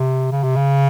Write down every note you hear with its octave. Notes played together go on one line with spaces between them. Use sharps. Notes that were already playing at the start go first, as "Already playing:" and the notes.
Already playing: C3
C#3
C3
C#3